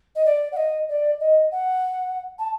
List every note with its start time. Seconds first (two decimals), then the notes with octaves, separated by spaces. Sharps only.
0.15 D#5
0.25 D5
0.52 F#5
0.56 D#5
0.89 D5
1.20 D#5
1.51 F#5
2.39 A5